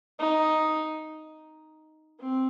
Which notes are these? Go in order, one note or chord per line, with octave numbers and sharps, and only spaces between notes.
D#4
C4